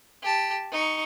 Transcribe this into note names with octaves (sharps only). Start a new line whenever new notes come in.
G4 A5
D#4 C#6